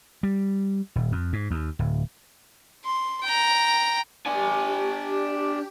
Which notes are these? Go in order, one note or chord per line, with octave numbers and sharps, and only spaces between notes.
G3
D#1
F2
G#2
D#2
D1
C6
G5 A#5
D4 G4 G#5